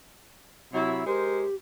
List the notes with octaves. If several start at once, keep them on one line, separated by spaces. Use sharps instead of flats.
C3 F#3 E4
G#3 G4 A#4 C5